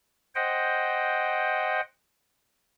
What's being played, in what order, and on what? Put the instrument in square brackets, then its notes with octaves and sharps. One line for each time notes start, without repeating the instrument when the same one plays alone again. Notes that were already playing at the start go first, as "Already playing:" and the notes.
[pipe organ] C5 D#5 F#5 G5